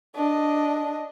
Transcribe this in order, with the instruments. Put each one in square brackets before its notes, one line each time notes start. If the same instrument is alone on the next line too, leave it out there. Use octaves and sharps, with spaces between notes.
[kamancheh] D4 D#5